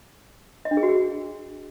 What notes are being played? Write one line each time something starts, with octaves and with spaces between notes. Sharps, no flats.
D#5
D4
G#4
F#4
G#4